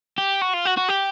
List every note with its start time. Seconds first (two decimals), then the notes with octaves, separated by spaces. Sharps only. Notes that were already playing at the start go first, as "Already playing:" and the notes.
0.18 G4
0.42 F#4
0.54 F4
0.66 F#4
0.77 F#4
0.89 G4